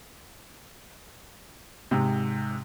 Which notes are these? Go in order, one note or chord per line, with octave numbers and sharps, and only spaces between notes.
G#2 C3